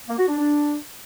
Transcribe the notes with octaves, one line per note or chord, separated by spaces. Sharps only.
A#3
F#4
D4
D4